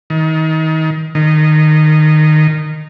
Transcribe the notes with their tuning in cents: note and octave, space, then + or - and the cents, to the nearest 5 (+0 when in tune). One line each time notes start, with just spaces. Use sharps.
D#3 +30
D#3 -15